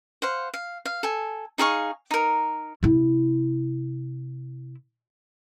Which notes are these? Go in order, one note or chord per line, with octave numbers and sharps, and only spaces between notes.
C5 F5 F#5
F5
F5
A4 G#5
D#4 G#4 F5 C#6
D#4 A#4
C3 E4